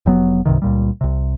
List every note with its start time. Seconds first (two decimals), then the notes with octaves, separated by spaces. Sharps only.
0.06 F1 F#3 B3
0.45 C2 G2 C3 D#3
0.62 C#2 A#2 G3
1.01 C2 C3